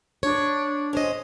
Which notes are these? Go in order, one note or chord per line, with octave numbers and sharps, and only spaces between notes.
D4 C#5
C#4 C5 D#5